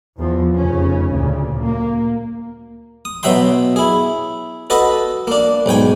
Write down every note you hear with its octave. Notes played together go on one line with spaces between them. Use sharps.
E2 F3
F1 C#3 C#4
D2 A#2 C#3
A#3
D#6
B2 F#3 F#4 E5 G5 C6
E4 G#4
F#4 A4 B4 D#5 F#5
A#3 D4
B1 G#2 G5 G#5